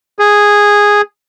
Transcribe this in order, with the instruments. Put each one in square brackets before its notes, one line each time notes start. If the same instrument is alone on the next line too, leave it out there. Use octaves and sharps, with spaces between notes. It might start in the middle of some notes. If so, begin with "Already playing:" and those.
[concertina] G#4